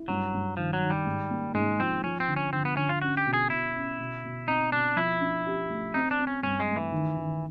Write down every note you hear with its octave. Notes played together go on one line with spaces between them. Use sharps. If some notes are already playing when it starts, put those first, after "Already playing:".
Already playing: E4
G2 F#3
G2
D#3 F3
F#3
D#3
G3
G#2
A#3
G#2 G#3
F3 C4
F3 C#4
C4
D3
C#4
D3 C4
B3
D3 C#4
F4
C#4 F#4
G4
B2
G#4
B2 E4
C#4
B2
B2
C4 D#4
B2 D4
F3 E4
D4
G4
A3
C4 D#4
D4
C4
C#4
G2 C#4
G#3
A3
E3
D#3
D#3